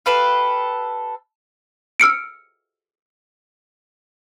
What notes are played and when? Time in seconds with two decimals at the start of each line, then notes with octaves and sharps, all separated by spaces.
0.06 G4 A4 B4 F5
2.00 E6 F6 C#7 D7